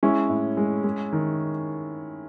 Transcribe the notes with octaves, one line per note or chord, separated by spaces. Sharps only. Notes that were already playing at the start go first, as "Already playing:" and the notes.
G#3 C#4 E4
A2
G#3
G#3
D#3